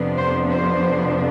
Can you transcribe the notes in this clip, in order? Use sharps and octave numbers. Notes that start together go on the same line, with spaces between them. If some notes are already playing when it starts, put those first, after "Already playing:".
Already playing: F2 C3 F3 B3 D4
C5
C5